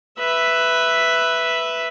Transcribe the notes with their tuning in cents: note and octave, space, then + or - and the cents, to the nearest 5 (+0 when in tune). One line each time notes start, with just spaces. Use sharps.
B4 +0 E5 +0